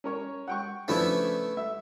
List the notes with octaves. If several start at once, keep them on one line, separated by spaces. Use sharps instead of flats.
C#4 A#4 C#5
F#5 G5 C#6
C#3 F3 A3 B3 D4 E4
E5